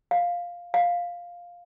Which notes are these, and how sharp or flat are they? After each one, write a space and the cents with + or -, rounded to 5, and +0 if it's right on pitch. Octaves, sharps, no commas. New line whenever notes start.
F5 +5
F5 +5